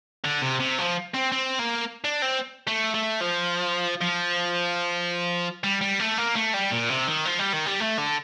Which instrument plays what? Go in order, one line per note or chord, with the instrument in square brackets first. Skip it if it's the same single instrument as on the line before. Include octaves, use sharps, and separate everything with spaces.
[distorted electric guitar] D3
C3
C3
F3
C4
C4
A#3
D4
C4
A3
A3
F3
F3
G3
G3
A3
A#3
A3
G3
A#2
C3
D#3
F3
G3
D#3
G3
A3
D3